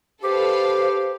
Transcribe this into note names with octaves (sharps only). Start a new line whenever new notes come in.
G4 A4 B4 C5 F5